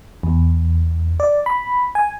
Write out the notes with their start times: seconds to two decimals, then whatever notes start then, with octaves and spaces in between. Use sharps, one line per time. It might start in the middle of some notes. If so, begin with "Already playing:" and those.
0.23 E2
1.20 D5
1.46 B5
1.95 G#5